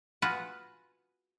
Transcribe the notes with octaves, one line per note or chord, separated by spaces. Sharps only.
F4 F#4 G#4 B4 F#5